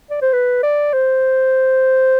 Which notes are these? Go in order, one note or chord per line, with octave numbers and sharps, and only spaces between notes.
D5
C5
B4
D5
C5